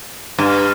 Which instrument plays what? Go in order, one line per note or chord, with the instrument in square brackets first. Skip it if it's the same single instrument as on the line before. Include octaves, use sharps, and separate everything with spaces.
[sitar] G2